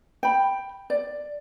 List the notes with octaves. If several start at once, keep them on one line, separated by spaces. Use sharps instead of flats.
G5 B5
D5